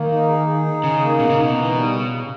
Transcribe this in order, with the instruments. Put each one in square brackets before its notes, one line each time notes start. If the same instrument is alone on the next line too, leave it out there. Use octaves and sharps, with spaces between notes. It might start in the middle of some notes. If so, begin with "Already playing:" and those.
Already playing: [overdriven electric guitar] D#3 [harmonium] A#3
[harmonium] D#4
G#4
G#4
D#4
[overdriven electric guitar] C#3 [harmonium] G#4
[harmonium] A#3
[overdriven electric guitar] B2 [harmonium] D#4
[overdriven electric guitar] C#3
[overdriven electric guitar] B2 [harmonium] D#4
[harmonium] E3
G3
C#3
C#3